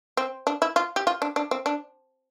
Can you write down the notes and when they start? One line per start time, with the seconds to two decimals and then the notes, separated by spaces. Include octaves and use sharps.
0.17 C4
0.47 D4
0.62 E4
0.76 F4
0.96 G4
1.07 F4
1.22 D4
1.36 D4
1.51 C4
1.66 D4